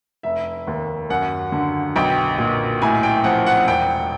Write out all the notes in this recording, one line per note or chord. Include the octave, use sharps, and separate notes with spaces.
F1 E5
D#2
F#2 F#5
D3
B1 G5
A#2
A2 G#5
G5
F3 F#5
F#5
E1 G5